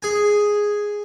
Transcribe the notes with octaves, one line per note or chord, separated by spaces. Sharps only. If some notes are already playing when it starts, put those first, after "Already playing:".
G#4 G#5